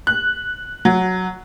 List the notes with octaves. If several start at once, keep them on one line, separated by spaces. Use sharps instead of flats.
F#6
F#3